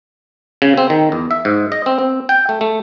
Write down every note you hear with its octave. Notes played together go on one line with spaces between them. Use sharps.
C#3
C4
D#3
E2
E5
G#2
D#5
C4
C4
G5
A3
A3